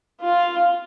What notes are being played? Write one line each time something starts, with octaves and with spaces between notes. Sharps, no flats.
F4